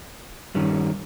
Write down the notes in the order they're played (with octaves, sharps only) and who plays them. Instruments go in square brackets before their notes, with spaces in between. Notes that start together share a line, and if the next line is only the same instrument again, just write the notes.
[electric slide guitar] G2 D#3 G3 C#4